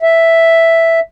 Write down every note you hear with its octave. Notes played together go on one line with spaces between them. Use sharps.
E5